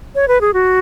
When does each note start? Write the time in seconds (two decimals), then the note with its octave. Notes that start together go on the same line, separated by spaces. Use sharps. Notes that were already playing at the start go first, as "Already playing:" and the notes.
0.15 C#5
0.28 B4
0.41 G#4
0.54 F#4